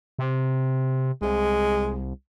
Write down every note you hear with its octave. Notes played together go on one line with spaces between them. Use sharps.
C3
C2 G#3